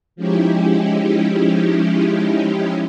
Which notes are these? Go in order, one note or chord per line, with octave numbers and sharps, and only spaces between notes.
F3 G#3 C#4 D#4 E4 G4